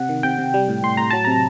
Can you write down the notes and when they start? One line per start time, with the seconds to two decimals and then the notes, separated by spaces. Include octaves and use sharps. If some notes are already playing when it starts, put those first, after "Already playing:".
Already playing: C3 F#5
0.09 D#3
0.23 C3 G5
0.38 C3
0.54 G3
0.68 A2
0.83 A2 C6
0.97 A2 A#5
1.10 F#3 A5
1.25 C3 A#5